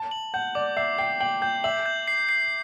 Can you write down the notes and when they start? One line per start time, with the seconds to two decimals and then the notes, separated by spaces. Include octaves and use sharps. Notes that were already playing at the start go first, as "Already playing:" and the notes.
Already playing: A5
0.11 F#7
0.34 F#5 G6
0.55 D5 D6
0.77 E5 C7
0.98 G5 C7
1.20 G5 F#7
1.42 G5 G6
1.64 E5 F#7
1.86 G6
2.07 C7
2.29 C7